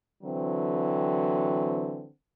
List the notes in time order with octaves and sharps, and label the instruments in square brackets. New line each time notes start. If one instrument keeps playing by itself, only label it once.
[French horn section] D3 E3 F#3 C4